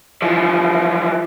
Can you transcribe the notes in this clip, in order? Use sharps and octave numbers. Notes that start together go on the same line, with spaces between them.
E3 F3